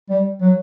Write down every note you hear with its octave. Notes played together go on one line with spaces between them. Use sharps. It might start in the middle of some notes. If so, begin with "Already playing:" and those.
G3
F#3